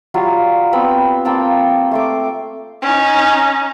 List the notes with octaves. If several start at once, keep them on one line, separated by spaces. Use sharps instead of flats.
F#3 G3 F4
B3 C4 B5
A#3 C4 G5 A5
A3 C6 D6
C#4 D#4